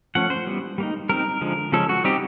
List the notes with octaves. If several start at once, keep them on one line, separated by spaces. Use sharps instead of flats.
F3 A3 C#4 F#5
C5
E3 G3 B3
G3 A#3 D#4
G3 C4 D#4 A#4
D3 F3 G#3
C#3 F3 G#3 C#4 A4
F#4
G3 C4 D#4 G4